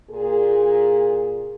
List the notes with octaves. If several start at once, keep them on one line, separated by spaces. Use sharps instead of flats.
A#2 G#4